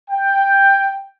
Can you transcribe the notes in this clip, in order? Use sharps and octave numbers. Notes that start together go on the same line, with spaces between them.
G5